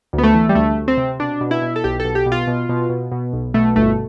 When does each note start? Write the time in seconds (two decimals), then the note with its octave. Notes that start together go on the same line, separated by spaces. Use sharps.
0.13 D2
0.18 B3
0.23 A3
0.34 E3
0.49 G3
0.55 D2 A3
0.77 D2
0.88 C4
0.98 C3
1.20 B2 D4
1.41 B2
1.51 E4
1.62 B2
1.76 A4
1.84 B1 G4
2.00 A4
2.05 B2
2.15 G4
2.26 B2
2.32 F4
2.47 B2
2.69 B2
2.90 B2
3.12 B2
3.33 B1
3.54 B2 A3
3.76 G1 A3